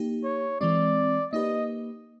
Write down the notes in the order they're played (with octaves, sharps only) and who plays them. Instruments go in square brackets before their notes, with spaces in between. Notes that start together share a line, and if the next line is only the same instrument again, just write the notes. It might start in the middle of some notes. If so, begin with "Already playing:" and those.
Already playing: [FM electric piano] A#3 D#4 G4
[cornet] C#5
[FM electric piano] E3 G#3 C4 [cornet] D5
[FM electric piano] A#3 D#4 G4 B4 [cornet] D#5